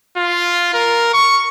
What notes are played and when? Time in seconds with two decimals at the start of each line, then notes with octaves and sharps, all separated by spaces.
0.17 F4
0.74 A#4
1.14 C#6